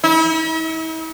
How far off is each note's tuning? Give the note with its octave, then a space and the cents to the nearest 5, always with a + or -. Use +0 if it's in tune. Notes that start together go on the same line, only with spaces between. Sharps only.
E4 -45